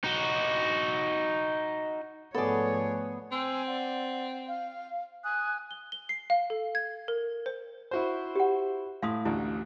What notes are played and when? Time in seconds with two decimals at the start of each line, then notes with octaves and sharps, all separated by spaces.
0.04 D#4 F#4
2.34 G#2 F3 A3 B3 G#4 A4 C#5 D5
3.32 C4 G#5 C6 E6
3.66 D5 F#5
4.48 F5
5.23 G#5 D#6 F#6
5.71 G7
5.92 G7
6.09 C7
6.30 F5
6.50 A4
6.75 G#6
7.08 A#4
7.46 C5
7.91 E4 F#4 C5
8.35 G4 F#5
9.02 A2 F5 C6 D#6
9.25 A1 D2 E4